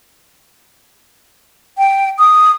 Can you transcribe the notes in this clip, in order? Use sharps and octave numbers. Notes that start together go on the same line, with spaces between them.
G5
D#6